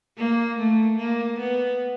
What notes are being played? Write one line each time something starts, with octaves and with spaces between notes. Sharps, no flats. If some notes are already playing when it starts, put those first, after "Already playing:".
A#3
A3
A#3
B3